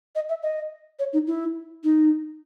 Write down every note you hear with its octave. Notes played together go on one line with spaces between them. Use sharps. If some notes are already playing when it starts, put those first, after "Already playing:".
D#5
E5
D#5
C#5
D#4
E4
D#4